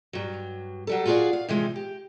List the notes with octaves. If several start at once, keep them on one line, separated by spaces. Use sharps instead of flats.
G2 F#3
F#3 G3 A4
F4 F#4 G#4 A4 D5 F5
F5
C3 E3 F3 G#3
G4